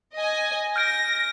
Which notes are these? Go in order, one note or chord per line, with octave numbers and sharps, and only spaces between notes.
D#5 G#5
F6 G6 A#6 D7